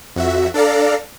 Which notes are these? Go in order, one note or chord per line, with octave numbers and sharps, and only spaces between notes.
F2 F#4 E5
D4 A4 D5 F5 A#5